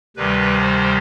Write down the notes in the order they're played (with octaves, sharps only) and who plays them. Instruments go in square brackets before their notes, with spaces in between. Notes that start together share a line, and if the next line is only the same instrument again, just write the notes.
[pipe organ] D2 C3 D#3 G3 B4
C5